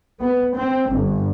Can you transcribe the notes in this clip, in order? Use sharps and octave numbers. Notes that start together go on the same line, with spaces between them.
B3
C4
G1